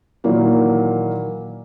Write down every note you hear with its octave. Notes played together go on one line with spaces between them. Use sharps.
A#2 D#3 E3 F#3 A#3